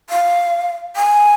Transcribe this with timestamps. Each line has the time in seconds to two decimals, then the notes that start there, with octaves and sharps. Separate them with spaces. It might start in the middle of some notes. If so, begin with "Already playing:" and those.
0.10 F5
0.96 G#5